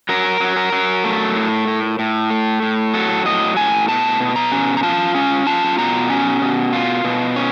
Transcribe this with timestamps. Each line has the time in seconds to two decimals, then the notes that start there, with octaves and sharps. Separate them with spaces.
0.09 F#3 A#4
0.40 F#3
0.56 A#4
0.72 F#3
1.04 A3
1.36 A2
1.67 A2
1.99 A2
2.30 A3
2.62 A2
2.94 F#3 A4
3.25 A2 D#5
3.57 A2 G#5
3.88 B2 A5
4.20 B2
4.36 A#5
4.52 C#4
4.77 A#5
4.83 F4 A5
5.15 C#4
5.46 F4 A5
5.78 B2 A#5
6.10 C#4
6.42 B2
6.73 F4
7.04 B2
7.36 C#4